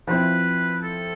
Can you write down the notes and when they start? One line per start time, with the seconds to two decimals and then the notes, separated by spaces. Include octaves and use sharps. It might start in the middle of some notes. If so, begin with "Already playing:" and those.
0.07 F3 C4 E4 B4
0.83 A4